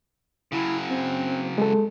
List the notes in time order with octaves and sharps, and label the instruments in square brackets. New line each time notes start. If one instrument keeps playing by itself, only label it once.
[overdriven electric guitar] C#3 F#3 [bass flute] E4
[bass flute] C4
[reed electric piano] G#3 A4